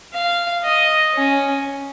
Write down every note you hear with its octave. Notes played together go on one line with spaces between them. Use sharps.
F5
D#5
C#4